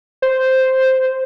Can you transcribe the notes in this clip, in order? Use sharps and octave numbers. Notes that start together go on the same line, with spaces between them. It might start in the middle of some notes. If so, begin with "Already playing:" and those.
C5